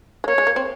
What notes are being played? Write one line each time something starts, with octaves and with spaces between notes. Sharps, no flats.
G#3
A#3 C#5
G#3
A#3
C4